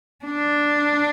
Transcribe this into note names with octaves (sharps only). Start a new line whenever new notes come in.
D4